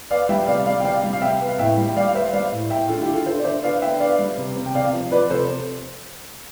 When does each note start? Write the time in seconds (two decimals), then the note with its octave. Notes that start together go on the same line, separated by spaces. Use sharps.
0.10 B3 D5 F5
0.29 G3 E5 G5
0.48 C3 D5 F5
0.66 G3 D5 F5
0.80 G5
0.85 C3 D5 F5
1.03 G3
1.13 F5
1.22 C3 E5 G5
1.41 B3
1.48 F5
1.59 A2 E5 G5
1.78 G3
1.88 G5
1.97 G3 D5 F5
2.09 F5
2.15 B3 C5 E5
2.33 G3 D5 F5
2.52 A2
2.70 A2 E5 G5
2.89 D3 F4 A4
3.01 E4 G4
3.08 D3
3.14 F4 A4
3.26 D3 A4 C5
3.39 D5
3.44 D3 C5 E5
3.63 B3 D5 F5
3.82 D3 E5 G5
4.00 B3 D5 F5
4.19 G3
4.37 C3
4.56 C3
4.66 G5
4.75 C3 D5 F5
4.93 F3
5.11 F3 B4 D5
5.30 C3 A4 C5